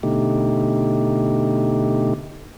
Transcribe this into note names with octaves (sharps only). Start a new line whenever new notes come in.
B2 D3 A3 D#4 G4